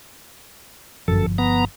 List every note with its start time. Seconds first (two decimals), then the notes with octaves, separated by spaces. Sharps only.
1.08 G1 C2 F#2 F3 A4
1.38 B3 A#5